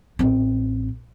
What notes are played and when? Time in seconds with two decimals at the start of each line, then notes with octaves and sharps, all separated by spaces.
0.19 A1 C4